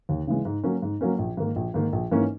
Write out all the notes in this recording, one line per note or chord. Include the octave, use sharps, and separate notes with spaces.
D#2
C#3 E3 G#3
G#2
F#3 A#3 C#4
G#2
F#3 A#3 C#4
A#1
G#2 D#3 A#3
A#1
G#2 D#3 A#3
A#1
G#2 E3 A#3 C#4